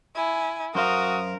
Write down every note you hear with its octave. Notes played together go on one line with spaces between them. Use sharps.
E4 G#5
F#2 F#4 A#4 C5 F5 D#6